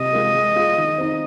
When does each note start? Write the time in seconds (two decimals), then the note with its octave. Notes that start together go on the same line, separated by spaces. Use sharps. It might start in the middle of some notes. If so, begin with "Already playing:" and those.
Already playing: C3 D#5
0.13 G#3 F4 A#4
0.34 G#3
0.56 F4 G#4
0.77 D#3
0.98 C4 D#4